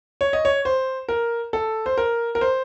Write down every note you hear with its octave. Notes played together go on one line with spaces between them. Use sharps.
C#5
D#5
C#5
C5
A#4
A4
C5
A#4
A#4
C5